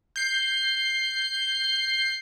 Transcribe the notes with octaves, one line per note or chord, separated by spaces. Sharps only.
G6 C7